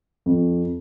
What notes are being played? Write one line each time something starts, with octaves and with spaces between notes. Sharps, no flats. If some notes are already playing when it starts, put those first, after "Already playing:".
F2